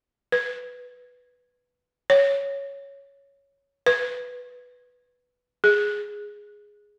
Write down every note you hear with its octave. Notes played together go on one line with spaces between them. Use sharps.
B4
C#5
B4
G#4